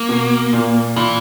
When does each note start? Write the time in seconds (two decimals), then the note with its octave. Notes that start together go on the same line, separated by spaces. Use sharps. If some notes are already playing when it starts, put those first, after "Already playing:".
Already playing: A#3
0.09 B2
0.53 A#2
0.96 A#2 E3